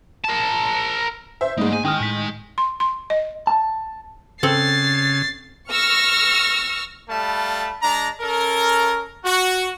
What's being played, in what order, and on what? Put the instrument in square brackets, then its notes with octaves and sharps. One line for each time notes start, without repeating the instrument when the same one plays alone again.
[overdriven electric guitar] A#4 A5
[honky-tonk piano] C5 E5
[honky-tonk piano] G#2 D#4 [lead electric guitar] G3 [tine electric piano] A3 A#3
[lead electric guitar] G#5
[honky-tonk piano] D#3 [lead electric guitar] G#3 G#5 [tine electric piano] G5 D#6 F6
[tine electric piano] A2 B6
[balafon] C6
C6
D#5
[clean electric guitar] A5
[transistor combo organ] C#3 [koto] C4 A4 [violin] A6 C7
[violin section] C#6 E6 F6 A#6
[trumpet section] G3 A3 F5 A5 B5
G#3 D4 A#5
C#4 A4 A#4
F#4